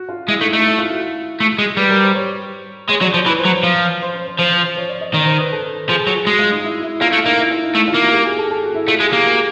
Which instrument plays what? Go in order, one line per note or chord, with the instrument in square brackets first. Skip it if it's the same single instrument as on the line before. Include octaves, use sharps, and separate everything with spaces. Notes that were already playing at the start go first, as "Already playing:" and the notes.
Already playing: [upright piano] F#4
F4
[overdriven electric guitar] G#3 [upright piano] E4
[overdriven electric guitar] A3 [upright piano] D#4
[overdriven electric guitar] A3 [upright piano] D#4
[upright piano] E4
F4
F#4
[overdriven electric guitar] A3
G#3
[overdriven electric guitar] G3 [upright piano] B4
[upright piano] A#4
C5
C#5
[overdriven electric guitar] G#3 [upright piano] C#5
[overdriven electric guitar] F#3 [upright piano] D5
[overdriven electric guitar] F3 [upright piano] C#5
[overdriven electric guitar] E3 [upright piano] B4
[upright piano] C5
[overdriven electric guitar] F#3
[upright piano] C#5
[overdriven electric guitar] F3
[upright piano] C5
C5
C5
[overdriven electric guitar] F3 [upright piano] C5
[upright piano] C5
C5
C#5
D5
D#5
[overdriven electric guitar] D#3 [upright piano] D5
[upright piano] C5
B4
A4
[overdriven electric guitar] F3 [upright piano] G#4
[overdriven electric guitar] F#3
[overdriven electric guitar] G#3 [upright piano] F#4
[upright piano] F4
D#4
E4
E4
[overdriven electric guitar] A#3 [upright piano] F4
[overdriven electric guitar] A3 [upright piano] E4
[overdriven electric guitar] A#3 [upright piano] D#4
[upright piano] E4
F4
D#4
[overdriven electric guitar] A3 [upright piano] E4
[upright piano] F4
[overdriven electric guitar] A#3
[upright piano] F#4
G4
G#4
A4
A4
F#4
E4
[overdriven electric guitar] A3 [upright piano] F4
[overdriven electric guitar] G#3 [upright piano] G#4
[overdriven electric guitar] A#3 [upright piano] G4
[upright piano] F#4